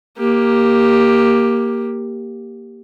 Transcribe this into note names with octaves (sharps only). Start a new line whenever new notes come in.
A#3 G4